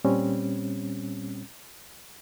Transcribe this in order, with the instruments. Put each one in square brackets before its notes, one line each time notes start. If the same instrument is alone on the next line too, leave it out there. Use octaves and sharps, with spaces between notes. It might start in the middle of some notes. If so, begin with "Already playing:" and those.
[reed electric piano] A#2 G3 C4 C#4